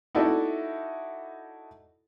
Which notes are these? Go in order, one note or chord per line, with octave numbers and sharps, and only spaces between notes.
D#4 E4 F#4 A4 D5